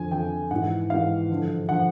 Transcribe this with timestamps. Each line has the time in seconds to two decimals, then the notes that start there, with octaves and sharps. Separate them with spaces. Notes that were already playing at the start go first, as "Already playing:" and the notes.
Already playing: F2 D3 F3 G#5
0.11 F2 D3 F3 G5
0.51 G#2 F#5
0.56 E3
0.90 G#2 E3 F5
1.29 G2 D3 F3
1.69 D3 F3 F#5